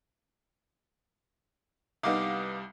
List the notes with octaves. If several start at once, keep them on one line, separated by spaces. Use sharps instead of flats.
C2 G3 B3 D#4 F5 D6 D#6